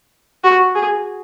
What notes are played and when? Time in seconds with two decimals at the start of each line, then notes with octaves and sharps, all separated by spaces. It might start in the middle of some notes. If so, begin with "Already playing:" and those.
0.44 F#4
0.75 G#4